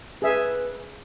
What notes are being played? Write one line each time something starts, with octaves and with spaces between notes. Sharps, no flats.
G#4 B4 E5